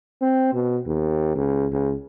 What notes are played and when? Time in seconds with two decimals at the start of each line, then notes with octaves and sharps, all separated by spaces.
0.22 C4
0.53 B2
0.86 D#2
1.36 C#2
1.72 C#2